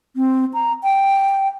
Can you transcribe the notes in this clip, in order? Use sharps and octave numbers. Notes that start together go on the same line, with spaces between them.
C4
A#5
G5